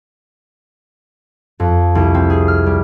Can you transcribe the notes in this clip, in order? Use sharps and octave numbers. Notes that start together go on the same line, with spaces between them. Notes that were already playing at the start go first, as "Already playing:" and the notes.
F2
C2
C4
G#4
F6
G3